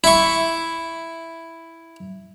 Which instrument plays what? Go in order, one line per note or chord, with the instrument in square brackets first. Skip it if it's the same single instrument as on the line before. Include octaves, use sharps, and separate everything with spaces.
[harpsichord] E4 C#6